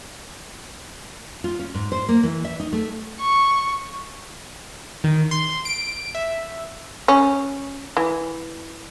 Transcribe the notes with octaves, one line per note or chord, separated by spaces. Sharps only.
F4
C#4
G#2
C5
A#3
E3
E5
D#4
A3
C#6
D#3
C6
D7
E5
C#4
E3